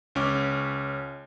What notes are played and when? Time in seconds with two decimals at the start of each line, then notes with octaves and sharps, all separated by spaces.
0.15 C#2 C#4 D6